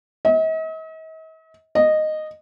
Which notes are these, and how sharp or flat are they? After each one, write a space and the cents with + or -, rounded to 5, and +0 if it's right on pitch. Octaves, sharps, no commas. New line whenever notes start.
D#5 +45
D#5 -10